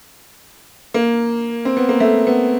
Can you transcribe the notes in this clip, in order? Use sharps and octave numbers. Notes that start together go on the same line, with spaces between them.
A#3
C4
B3
A#3
A3
B3